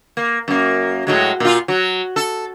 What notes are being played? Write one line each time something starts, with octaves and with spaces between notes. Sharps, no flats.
A#3
F#2 A#3
A2 F#3 G#3
A#2 F4
F#3
A4